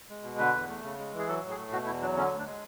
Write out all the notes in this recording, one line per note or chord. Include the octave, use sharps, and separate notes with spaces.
G#3
B2
D3 B4
E2
A3
C#3
G#3
E3
G#4
F#3 A4
A2
G#4
A3
B2 F#4
E2 E4
F#3 D4
D3 C#4
D2
D4
G#3